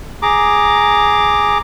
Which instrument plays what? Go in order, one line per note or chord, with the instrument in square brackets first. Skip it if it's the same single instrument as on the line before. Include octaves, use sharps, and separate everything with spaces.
[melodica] G#4 A#5 D6